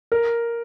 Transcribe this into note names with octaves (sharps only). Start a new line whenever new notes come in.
A#4